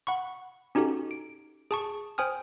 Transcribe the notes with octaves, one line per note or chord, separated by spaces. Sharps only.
F#5 B5 C#6
C#4 D#4 F#4 G4 A4
D7
G#4 A5 C#6
C5 G5 G#5 D#6 F6